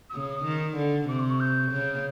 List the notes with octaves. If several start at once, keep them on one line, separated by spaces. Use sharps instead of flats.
E6
C#3 D#6
D#6
D#3
D3
C3 D6
C6
C#6
G6
C#3